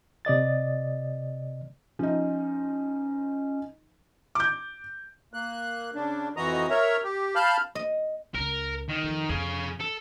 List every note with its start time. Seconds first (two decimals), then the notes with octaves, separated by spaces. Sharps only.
0.25 C3 D5 D#5 A6
1.99 F3 C#4 D#4
4.35 D6 G6
5.33 A#3 F#6
5.95 C#3 D4
6.37 F2 E3 F#4 D#5 A#5 D#6
6.70 A#4 C#5 E5 A#5
7.04 G4
7.35 F5 A5 B5 F6 G6
7.75 D#5
8.34 C#2 A#4
8.89 D#3
9.03 F2 E3
9.29 F2 G#4 F5
9.80 A4